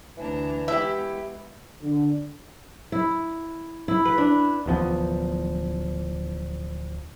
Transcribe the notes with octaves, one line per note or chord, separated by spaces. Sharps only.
D2 E3 D4 A#5
G#3 B3 E4 G4 E5
D3
E4
E4
B4
D4
D1 E2 F3 B3